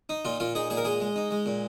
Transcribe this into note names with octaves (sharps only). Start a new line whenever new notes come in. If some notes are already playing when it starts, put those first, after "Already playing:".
D#4
A#2 F4
A#2 F4
D#4 G#4
A#2 G#4
A#4
G#3 G#4
G#3
D#4
G#3
A#2